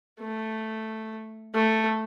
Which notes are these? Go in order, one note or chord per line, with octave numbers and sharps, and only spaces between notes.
A3
A3